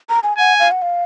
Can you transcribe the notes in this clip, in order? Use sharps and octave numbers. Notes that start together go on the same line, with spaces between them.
A#5
G#5
F#5 G#5
F5
F#5
F5